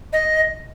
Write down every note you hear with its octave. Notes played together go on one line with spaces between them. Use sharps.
D#5